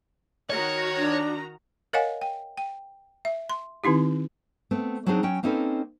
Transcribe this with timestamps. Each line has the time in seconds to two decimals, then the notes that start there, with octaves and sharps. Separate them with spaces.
0.50 D#3 F#4 C#5 A#5
0.97 D4
1.93 A#4 C#5 D#5 F5 F#5 G#5
2.21 G5
2.57 G5
3.25 E5
3.50 C6
3.84 D#3 C4 D#4 E4 G4
4.71 A3 B3 C4
5.06 F#3 G3 C4 D4 D#4 G#4
5.23 F#3 C#4 G5
5.43 A#3 C4 C#4 D#4 A4 B4